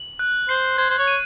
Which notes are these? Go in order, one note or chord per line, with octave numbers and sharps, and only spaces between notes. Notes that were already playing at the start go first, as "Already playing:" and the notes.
Already playing: F#7
F#6
C5 C7
C5 G#6
C5
C#5
D#7